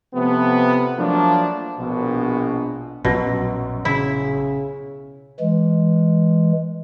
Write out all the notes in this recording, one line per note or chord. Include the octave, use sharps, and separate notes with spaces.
C3 F3 A3 B3
F3 F#3 A3 A#3 D4
A#1 B2
A#1 F#2 B2 F#4
C#3 E4
E3 G#3